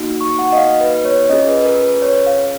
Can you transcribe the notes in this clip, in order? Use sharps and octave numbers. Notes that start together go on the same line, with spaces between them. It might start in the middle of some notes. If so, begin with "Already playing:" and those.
Already playing: A#3 D#4 F#4
C#6
F#5
D#5
F5
B4
C#5
C#4 F4 G#4 D#5
B4
B4
A#4
B4
C#5
F5